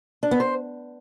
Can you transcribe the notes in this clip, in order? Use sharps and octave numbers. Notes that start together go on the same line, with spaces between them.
D4
B3
C5